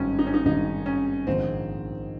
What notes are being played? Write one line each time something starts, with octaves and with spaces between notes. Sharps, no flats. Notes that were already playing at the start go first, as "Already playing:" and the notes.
Already playing: G#1 G2 D#3 G#3 C4 C#4
D#4
C#4
D#4
G#1 G2 D#3 G#3 D#4
C#4
A#1 G#2 D#3 G#3 C4